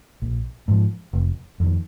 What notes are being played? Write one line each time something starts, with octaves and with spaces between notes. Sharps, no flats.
A#1
G#2 F3
F1
F2 D#3